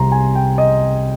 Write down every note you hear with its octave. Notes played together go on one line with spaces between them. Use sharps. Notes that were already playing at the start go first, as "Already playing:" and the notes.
Already playing: C2 C3 G3 A#5 C6
G#5
G5
D#5